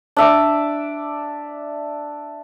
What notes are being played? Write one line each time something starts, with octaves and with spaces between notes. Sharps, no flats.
D4 E5 D6